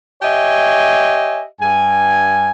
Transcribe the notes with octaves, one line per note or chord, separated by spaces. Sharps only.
G4 C#5 D#5 E5 G#5
G2 G#5